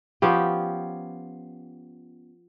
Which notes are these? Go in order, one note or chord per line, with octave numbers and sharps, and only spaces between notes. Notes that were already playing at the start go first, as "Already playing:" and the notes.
F3 B3 C#4 G4